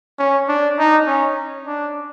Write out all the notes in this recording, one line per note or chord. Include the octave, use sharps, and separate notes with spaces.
C#4
D4
D#4
C#4
D4